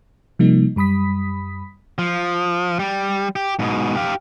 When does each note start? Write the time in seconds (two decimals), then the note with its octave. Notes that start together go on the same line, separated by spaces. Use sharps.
0.39 C3 F3 G3 A#3 D#4
0.76 F#2 G3 B5 D#6 B6
1.99 F3
2.79 G3
3.36 G4
3.59 G#2 B2
3.96 G4 F5